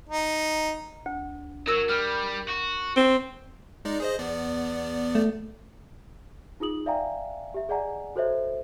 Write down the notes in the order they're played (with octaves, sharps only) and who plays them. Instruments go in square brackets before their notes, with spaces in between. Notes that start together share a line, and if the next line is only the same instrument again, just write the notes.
[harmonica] D#4
[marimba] D2
[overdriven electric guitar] F#3 [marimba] A#4 E6
[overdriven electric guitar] G3 [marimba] F6
[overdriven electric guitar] F#4
[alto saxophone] C4
[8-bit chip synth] G#3 D#4 D5
G#4 C5 D#5
E2 B3 D5
[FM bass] A3
[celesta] D#4 F4 G#4 D#6 F#7
D5 E5 F5 G5 G#5 A#5
G4 E5
G#4 D5 D#5 F#5 G#5 A#5
F#4 A4 C5 C#5 D#5 E5